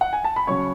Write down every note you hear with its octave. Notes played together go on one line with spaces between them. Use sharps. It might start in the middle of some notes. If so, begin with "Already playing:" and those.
F#5
G#5
A5
B5
C#3 F#3 C#4 C#5 C#6